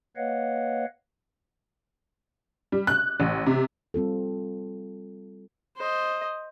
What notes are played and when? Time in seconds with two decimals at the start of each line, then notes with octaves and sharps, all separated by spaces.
0.16 A#3 B4 C#5 D#5 F5 F#5
2.72 G3
2.87 F#6
3.20 A1
3.46 C3
3.94 G3 C4 F4 A4
5.77 C5 D#5